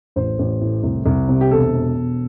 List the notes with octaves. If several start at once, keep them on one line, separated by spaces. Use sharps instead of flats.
A1 C5
A1
A2
C2
C2
C3
G4
E1 A4
E1
E1